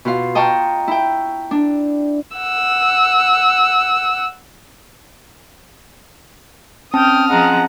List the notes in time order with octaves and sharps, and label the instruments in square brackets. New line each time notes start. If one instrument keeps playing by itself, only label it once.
[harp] B2 F4 F5
D#5 G5 A5 A#5 C#6 F6
E4 G5
D4
[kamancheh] F#5 E6
[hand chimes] C4 C#4 A5 [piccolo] G5 [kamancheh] D#6 F6
[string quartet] F3 G#3 A#5 [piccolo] F#5